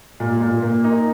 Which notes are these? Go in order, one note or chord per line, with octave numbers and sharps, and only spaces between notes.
A#2
A#2
A#3
D#4